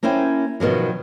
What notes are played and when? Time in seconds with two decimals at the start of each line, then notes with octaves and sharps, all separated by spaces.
0.03 A#3 C#4 E4 C5 G5
0.60 B2 D#3 F3 F#3